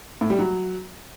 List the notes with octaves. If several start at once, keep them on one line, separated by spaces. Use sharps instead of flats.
A2
G3
F#3